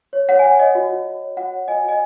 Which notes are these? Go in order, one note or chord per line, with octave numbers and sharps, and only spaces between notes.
C#5
C#5 F#5
G#5
C#5 F#5
C#5 D#5
F#4
F#4
F#4
C#5
F#4 F#5
C#5
F#4 D#5 G#5
F#4
D#5 G#5